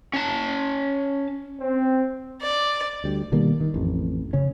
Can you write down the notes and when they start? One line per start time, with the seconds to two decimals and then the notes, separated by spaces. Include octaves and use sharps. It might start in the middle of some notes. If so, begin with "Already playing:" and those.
0.13 C#4 A5
1.61 C4
2.40 D5
3.04 D2 G3
3.32 B2 D#3 G3 A#3
3.61 D#3
3.74 A1 F2
4.33 C#3 C#4